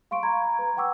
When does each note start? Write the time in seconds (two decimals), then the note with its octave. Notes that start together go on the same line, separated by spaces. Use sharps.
0.11 F5 C6 C#6 D7
0.23 A#5 B5 G#6
0.59 B4 A#5
0.77 F#5 G5 C#6 D6 E6